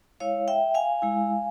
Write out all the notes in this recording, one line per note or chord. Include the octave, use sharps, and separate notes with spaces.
G#3 E4 C#5 F5
E5 G5
F5 G#5
G#3 E4